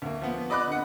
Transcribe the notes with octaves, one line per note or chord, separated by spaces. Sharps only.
D2 A#3
F3 B3
D5 D#5 B5 D6 F#6
D3 F#5